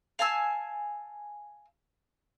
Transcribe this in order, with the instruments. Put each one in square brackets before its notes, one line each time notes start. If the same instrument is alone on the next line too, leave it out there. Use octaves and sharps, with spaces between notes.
[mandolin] F5 G#5 A5 E6